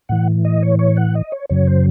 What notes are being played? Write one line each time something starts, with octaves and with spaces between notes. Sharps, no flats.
A2 E3 F#5
D#5
C#5
C#5
F#5
D#5
C#5
F#2 C#3 F#3 C#5
C5